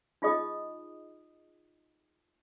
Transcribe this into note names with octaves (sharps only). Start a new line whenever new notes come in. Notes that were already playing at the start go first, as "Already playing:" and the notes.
D#4 F4 G#4 D#5 D#6